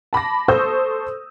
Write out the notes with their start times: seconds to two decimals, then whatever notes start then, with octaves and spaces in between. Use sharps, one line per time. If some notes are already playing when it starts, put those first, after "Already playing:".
0.13 A5 B5 D6 A#6
0.48 A4 C5 C#6 D#6 E6 G6